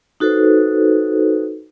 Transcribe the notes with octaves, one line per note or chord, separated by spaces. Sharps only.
D#4 F#4 A4 B4 C5